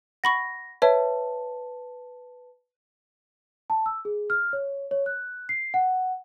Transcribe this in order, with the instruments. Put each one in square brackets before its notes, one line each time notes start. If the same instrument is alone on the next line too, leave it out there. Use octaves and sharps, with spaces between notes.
[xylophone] F#5 B5 C#6 [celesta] A#6
[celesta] B4 A5 [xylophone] C#5 E5
[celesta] A5
E6
G#4
F6
C#5
C#5
F#6
C7
F#5